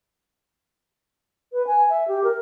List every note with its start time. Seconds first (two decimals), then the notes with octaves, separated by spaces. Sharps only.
1.53 B4
1.67 G#5
1.90 E5
2.08 G4
2.24 A#4